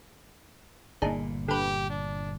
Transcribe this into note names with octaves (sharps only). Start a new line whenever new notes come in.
G1 A#2 A#3 D4 D#4 G#4
D3 G4 B4
D4